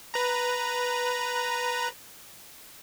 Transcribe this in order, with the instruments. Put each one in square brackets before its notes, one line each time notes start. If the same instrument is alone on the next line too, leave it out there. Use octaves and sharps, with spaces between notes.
[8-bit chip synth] B4 A#5